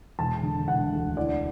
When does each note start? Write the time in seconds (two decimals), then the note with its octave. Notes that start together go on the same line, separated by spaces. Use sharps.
0.19 E1 A5
0.43 D3
0.68 E1 F#5
0.93 D2
1.16 E3 D5